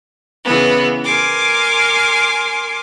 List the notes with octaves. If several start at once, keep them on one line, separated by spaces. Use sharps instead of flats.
C#3 E3 B3
A#4 G#5 C6 D6